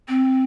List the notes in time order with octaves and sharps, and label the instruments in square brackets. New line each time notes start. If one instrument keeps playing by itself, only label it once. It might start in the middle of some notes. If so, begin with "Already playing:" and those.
[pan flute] C4